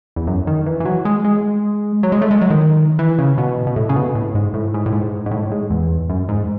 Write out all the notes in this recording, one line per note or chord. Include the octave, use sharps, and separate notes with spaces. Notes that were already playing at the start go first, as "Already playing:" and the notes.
E2
F#2
D#3
E3
E3
F#3
G#3
G#3
F#3
G#3
A3
G#3
F#3
D#3
E3
C#3
B2
B2
A2
C#3
B2
A2
G#2
A2
G#2
A2
G#2
G#2
A2
G#2
E2
F#2
G#2